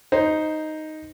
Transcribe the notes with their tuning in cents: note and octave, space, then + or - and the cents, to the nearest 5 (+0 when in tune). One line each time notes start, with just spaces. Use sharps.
D#4 +0 C5 +0